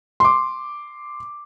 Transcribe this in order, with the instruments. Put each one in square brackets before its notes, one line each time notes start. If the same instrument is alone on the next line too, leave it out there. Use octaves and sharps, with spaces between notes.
[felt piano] C6 D6